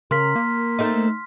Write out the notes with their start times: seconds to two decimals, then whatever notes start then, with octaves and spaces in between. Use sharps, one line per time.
0.11 C#3 A#4 C6 F6 B6
0.35 A#3
0.79 A3 C4 D#4